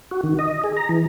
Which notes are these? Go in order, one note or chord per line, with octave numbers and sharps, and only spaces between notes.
F#4
D#3
D#5
G#4
A#5
E3